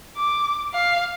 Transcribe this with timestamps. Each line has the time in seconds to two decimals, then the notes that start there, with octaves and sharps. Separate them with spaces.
0.17 D6
0.74 F5